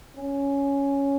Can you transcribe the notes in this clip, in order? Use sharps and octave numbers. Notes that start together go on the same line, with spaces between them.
C#4